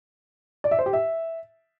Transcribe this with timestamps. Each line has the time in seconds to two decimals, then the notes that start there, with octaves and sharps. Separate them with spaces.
0.64 D5
0.71 E5
0.79 C5
0.86 G4
0.93 E5